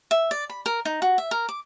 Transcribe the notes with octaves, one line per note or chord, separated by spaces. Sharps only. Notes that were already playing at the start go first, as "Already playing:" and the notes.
E5
D5
B5
A#4
D#4
F#4
E5
A#4
D6